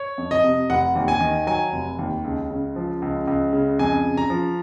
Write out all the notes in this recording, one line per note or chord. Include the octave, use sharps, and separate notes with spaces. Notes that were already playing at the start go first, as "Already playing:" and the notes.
Already playing: C#5
F2
D#5
C3
F1 F#5
D#2
G#5
D#3
F#3 G#5
F1
D#2
C#2
C#3
F3
C#2
C#2
C#3
F2 G#5
C#3
A#5
F3